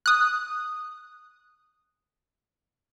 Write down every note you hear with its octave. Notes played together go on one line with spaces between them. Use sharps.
D#6 F#6